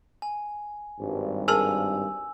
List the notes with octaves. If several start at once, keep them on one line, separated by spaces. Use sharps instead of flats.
G#5
G#1 G2
G#4 A#4 G#5 A5 E6